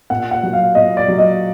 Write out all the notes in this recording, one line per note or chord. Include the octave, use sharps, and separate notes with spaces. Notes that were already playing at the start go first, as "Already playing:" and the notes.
A#2 F#5
F#5
F#3
F5
A#2 D#5
D5
F#3
D#5